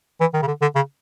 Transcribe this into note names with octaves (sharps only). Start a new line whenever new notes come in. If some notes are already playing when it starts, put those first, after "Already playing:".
E3
D#3
C#3
D3
D3
C#3